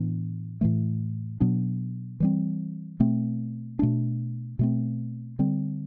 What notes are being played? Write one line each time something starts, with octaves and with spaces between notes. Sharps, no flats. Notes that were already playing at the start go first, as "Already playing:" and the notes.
Already playing: A2 E3 B3 D4
A2 E3 A3
B2 F#3 B3 D4
E3 G3 C4
B2 A3 C4
B2 A3 D4
B2 A3 C4
D3 G3 C4